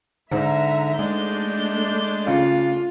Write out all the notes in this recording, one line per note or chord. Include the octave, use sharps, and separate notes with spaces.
G#2 D3 E5 A#5
G#3 A3 D4 D5 G6
C#3 F4